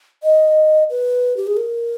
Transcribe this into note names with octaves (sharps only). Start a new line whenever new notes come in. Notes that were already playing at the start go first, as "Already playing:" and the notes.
D#5
B4
G4
G#4
A#4